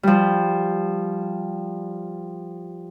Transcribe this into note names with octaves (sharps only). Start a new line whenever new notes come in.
F3 G3